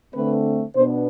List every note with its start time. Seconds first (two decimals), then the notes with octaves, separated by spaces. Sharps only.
0.14 D3 A3 C4 B4
0.74 B2 B3 D4 C5